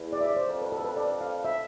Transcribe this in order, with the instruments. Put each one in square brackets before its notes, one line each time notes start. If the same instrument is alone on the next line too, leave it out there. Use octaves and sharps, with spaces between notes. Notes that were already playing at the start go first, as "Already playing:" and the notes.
Already playing: [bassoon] E2
[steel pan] D5
E5
D5
C5
[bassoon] F2
[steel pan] B4
A4
B4
D5
F5
E5